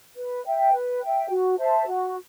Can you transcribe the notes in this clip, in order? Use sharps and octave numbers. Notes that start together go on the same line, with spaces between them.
B4
E5 G5
B4
E5 G5
F#4
C5 E5 A5
F#4